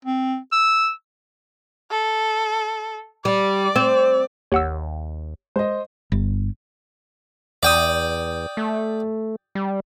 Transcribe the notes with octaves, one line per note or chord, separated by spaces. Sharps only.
C4
E6
A4
G3 D5
C4
G1 D#2 A#3 G4 C#5 F#5 E6
G#3 C5 D#5
G1
E2 D5 G5 D#6
A3
G3